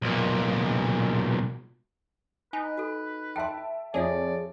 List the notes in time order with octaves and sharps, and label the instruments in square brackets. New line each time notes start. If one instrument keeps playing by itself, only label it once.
[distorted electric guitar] B1 A#2
[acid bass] D#4 [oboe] B4 [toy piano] G#5
[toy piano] F#4 A4
[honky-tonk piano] E5 A5 D7 [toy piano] G5 C6
[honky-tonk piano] F2 C#5 [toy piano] F4 E5 G#5 [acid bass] G#4 [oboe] D5